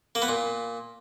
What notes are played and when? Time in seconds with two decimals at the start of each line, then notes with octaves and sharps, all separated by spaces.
0.15 A#3
0.22 B3
0.29 A#2